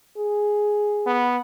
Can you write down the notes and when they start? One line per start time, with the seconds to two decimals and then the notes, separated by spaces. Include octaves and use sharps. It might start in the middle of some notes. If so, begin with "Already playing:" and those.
0.17 G#4
1.06 B3